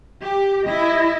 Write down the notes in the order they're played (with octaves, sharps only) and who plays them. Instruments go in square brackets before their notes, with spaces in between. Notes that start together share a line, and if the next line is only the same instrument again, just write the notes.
[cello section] G4
E4 D#5